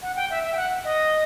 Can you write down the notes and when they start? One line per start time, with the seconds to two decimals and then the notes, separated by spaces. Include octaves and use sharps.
0.02 F#5
0.16 G5
0.30 E5
0.43 E5
0.52 G5
0.57 F#5
0.84 D#5